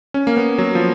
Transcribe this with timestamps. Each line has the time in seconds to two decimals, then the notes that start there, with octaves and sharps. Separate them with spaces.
0.14 C#4
0.27 A#3
0.37 B3
0.58 F#3
0.75 F3